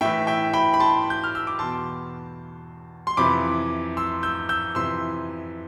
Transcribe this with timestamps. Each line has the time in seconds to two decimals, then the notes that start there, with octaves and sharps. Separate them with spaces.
0.01 A2 E3 E5 G5
0.27 E5 G5
0.54 G5 B5
0.74 B5
0.80 A5 C6
1.10 G6
1.24 F6
1.35 E6
1.47 D6
1.59 E2 B2 A5 C6
3.07 C6
3.17 F2 C3 E3 B5 D6
3.97 C6 E6
4.23 E6 G6
4.49 E6 G6
4.75 F2 C3 E3 C6 E6